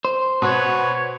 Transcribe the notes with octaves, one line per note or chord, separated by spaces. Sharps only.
C5
B2 F#4 B4 C#5